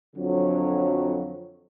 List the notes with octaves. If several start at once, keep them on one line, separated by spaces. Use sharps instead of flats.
F2 D3 F#3